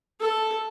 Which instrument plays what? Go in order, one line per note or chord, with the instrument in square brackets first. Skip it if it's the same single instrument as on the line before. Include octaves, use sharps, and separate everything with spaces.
[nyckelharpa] A4